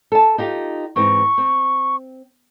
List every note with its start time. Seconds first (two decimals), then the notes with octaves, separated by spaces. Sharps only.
0.12 A4 A5
0.38 D#4 F4 G4
0.96 G#2 E3 C4 C#6
1.38 C4